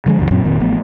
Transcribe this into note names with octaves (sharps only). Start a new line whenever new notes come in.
D3 F3 F#3 G#3
C#2 F#2 C#3 E3
F#2 A#2 F#3 C4
F1 A#2 D#3 C4
A1 F3 A3 B3